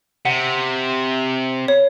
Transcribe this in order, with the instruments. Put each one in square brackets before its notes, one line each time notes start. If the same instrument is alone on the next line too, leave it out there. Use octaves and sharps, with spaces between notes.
[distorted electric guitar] C3 [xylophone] F#5
[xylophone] C#5